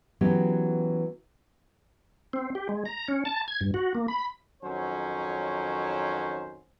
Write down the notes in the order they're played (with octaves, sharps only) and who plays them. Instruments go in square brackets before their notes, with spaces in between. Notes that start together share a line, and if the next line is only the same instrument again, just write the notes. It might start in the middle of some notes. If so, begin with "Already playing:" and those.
[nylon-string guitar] E3 F#3 B3 C#4 F#4 G4
[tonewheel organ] C4
G4
G#3
A#5
C#4
A5
G#6
G2
F#4
A#3
B5
[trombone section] F2 D#3 F#3 C#4 C5